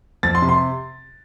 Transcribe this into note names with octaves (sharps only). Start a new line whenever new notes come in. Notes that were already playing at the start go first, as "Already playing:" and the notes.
F2 A6
C6
C3
C6